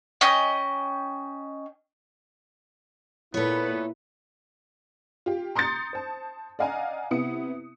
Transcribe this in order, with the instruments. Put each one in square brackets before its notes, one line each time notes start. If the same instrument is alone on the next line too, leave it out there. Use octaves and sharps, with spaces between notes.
[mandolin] C#4 D#5 G5
[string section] A#2 B4 [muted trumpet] B3 [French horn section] E4 [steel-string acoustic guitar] A4 C#5
[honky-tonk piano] F4 G4
A#5 C6 D#6 G6 A6 C#7
C5 A5
D5 D#5 F5 F#5 G#5 A#5
C3 B3 E4 D#6 C#7